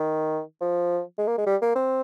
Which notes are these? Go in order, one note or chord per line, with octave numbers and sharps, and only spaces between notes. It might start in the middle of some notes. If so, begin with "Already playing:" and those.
Already playing: D#3
F3
G#3
A#3
G#3
G3
A#3
C4